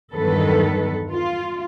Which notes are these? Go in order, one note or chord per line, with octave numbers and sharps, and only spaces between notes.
E2 G2 D#3 F#3 A4 B4
F4